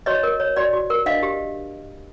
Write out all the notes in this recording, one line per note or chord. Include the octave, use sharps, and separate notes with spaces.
F#4 C#5 D#5
A#4
C#5
F#4 D5
F#4
A#4
D4 D#5 F5
G4